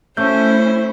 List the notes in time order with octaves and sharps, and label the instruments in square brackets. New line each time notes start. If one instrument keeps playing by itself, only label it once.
[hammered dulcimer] A3 [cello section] C#4 E4 [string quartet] C5 [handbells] G6